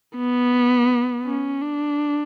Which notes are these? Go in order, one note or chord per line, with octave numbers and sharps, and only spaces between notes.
B3
C#4
D4